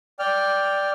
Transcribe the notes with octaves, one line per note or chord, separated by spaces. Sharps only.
D5 G5 F6